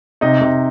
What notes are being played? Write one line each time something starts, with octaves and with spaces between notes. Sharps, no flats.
C3 D#4 D#5
C3